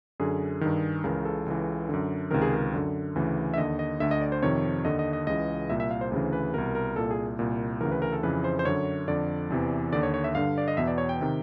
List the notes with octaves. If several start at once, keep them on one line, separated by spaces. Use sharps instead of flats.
F#2 D3 G#4
G2 D#3
C#2 C#3 E3 A#4
A4
C#2 C#3 E3
F#2 D3
C#2 C3 D#3 A#4
G#4
A#4
F#2 D3
D2 C#3 E3
E5
D#2 D3 D#5
D#5
D2 D3 E5
D#5
D5
C5
F2 C3 D#3 C#5
D#2 D3 D#5
D#5
D#5
C#2 C#3 E3 D#5
C2 A#2 E5
E5
F5
C5
D2 C#3 E3 C5
B4
C2 B2 A#4
A#4
C2 A#2 A4
G#4
C2 A#2
D2 C#3 E3 A#4
B4
A#4
A4
F2 C#3 E3 B4
C5
C5
F#2 D3 C#5
F2 D3 D5
E2 C3 E3
D#2 D3 D5
C#5
C#5
E5
G2 D3 F5
D5
D#5
E2 B2 E5
D5
C#5
G5
C3 D#3